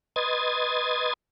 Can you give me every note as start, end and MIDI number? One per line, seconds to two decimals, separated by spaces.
0.16 1.13 71
0.16 1.13 75
0.16 1.13 84
0.16 1.13 87
0.16 1.13 92
0.16 1.13 93